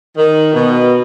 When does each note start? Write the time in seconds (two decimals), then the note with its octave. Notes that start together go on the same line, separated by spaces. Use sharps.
0.16 D#3
0.54 B2